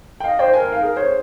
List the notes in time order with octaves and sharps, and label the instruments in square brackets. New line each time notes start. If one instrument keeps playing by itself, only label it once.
[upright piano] G5
[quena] D#5 [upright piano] F5
[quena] C5 [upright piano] G5
[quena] C5 [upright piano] G#5
[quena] A#4
[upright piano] G#5
F5
[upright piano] G#4 [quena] A#4
[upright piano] C5 [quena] C#5